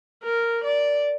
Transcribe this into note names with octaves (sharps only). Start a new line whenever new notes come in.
A#4
D5